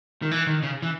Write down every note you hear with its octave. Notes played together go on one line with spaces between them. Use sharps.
D#3
E3
D#3
C#3
E3